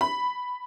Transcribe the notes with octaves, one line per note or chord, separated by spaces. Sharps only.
B5